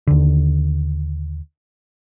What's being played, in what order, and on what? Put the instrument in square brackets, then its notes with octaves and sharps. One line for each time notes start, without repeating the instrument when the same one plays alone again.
[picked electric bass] D#2 D3